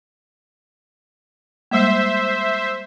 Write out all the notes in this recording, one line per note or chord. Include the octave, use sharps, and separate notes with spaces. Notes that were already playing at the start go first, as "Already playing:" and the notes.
G3 G#3 A#3 C5 E5